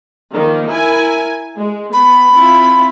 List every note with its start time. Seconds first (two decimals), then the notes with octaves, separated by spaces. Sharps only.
0.32 D#3 F3 A#3
0.67 E4 A#4 G#5
1.57 G#3
1.93 B3 B5
2.33 C4 E4 F4